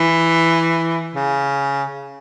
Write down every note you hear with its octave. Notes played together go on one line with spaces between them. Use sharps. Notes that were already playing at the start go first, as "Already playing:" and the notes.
Already playing: E3
C#3